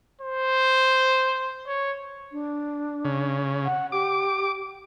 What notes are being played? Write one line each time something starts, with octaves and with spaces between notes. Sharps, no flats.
C5
C#5
D4
C#3
F#5
G4 D6